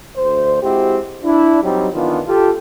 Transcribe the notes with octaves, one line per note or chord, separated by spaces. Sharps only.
D2 C5
G#3 C4 E4 F#4 G4
D4 E4
F#3 G3 C4 D4 D#4 G4
D#3 E3 B3 D4 F4
F4 G4 A4